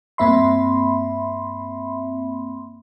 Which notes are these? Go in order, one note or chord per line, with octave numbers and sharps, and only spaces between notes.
G2 A#3 C4 E5 B5 C6